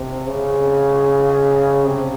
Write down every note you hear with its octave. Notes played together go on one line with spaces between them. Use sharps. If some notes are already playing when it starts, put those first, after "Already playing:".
Already playing: C3
C#3
C3